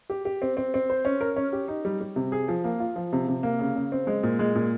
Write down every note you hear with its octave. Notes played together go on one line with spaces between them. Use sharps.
G4
G4
C4
C4
C4
C5
C#4
A#4
C#4
G4
D#4
G3
G3
C3
G#4
F3
A#3
F4
F3
C3
C3
A#3
C#3
C#3
C4
G#3
A#2
G#3
A#2